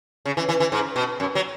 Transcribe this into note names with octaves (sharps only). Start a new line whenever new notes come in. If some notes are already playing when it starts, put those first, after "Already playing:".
C#3
E3
E3
E3
G#2
B2
F#2
F#3